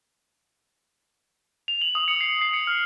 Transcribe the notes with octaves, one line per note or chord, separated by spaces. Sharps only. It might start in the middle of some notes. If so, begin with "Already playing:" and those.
F7
F#7
D#6
C#7
C7
C7
C#7
F6